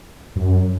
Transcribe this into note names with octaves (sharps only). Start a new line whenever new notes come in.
F#2